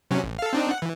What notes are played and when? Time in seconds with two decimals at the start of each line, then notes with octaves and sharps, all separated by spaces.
0.11 C3 F#3 C#4
0.23 A1
0.39 A4 F5
0.53 C4 D4 D#4
0.71 F#5
0.82 E3